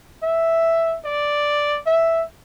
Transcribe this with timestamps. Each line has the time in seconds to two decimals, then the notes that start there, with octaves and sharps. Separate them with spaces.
0.23 E5
1.05 D5
1.86 E5